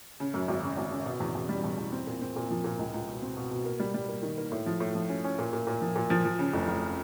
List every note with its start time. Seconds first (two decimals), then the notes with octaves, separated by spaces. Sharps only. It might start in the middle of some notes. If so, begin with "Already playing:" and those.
0.20 C#3
0.34 F#2
0.48 G#1
0.63 C#3
0.77 G#1
0.92 C#3
1.06 B2
1.20 E2
1.35 E2
1.49 G3
1.64 E2
1.78 E2
1.92 C4
2.07 A#2
2.21 C4
2.36 A#2
2.50 F3
2.64 A#2
2.79 C#2
2.94 C#2
3.08 B2
3.22 C4
3.37 B2
3.51 B2
3.65 A#3
3.80 G3
3.94 G3
4.09 A#3
4.23 D#3
4.38 A#3
4.52 A2
4.66 F3
4.80 A2
4.95 F3
5.09 C#4
5.24 C#4
5.39 A#2
5.53 A#2
5.67 A#2
5.81 F3
5.96 A#2
6.10 F3
6.25 F3
6.39 C#3
6.54 F1
6.68 F1